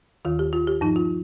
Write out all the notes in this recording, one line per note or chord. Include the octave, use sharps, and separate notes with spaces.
D#2 D#3 F4
G4
F4
G4
G2 F3 D#4
F4